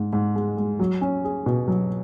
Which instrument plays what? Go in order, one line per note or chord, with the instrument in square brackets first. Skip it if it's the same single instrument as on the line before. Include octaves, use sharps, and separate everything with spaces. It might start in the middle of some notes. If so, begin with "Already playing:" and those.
Already playing: [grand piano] G#2
G#2
G#3
G#3
F#3
C#4
G#4
B2
F#3